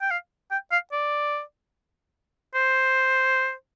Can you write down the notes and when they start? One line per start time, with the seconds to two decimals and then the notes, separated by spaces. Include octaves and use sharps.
0.01 G5
0.11 F5
0.51 G5
0.72 F5
0.92 D5
2.54 C5